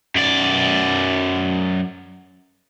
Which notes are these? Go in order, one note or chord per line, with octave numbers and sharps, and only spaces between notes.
F#2 D5